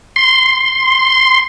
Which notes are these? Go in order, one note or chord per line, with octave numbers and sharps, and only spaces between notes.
C6